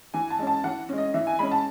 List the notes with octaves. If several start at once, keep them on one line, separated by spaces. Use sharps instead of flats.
E3 G#5
A5
G#3 C#4
A5
E3 F#5
G#3 C#4
D#5
E3 E5
G#5
G#3 C#4 B5
A5